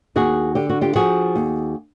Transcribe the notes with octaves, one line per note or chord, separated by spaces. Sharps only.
D#2 F#4 G#4
D3 G4
F#4
F4 G4
F3 F#4 G#4
D#2